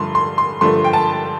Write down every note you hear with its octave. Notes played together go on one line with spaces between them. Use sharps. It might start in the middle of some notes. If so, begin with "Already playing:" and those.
Already playing: G2 D3 F3 A3 C6
C6
C6
G2 D3 F3 A3 C6
G5
A5